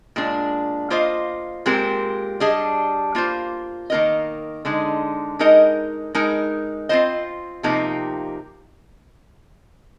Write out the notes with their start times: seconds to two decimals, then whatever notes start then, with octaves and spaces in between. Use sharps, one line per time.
0.16 A#2 G#3 D4
0.90 A#3 F4 C5 D#5
1.66 A#2 G#3 C4 G4 A#4
2.40 G3 D4 G#4 D#5
3.15 A#3 F4 C5
3.90 D#3 A#3 F4 A#4 D#5
4.65 D3 G#3 D#4
5.39 G#3 D#4 A#4 D#5
6.15 G#3 D#4 A#4
6.89 C4 F4 C5 D#5
7.63 C3 F3 A#3 D#4 G4